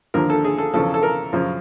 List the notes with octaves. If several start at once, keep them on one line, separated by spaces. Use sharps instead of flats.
D#2 D3 F3 A#4
A4
G#4
A4
E2 C#3 F3 A4
A4
A#4
F#2 C#3 F3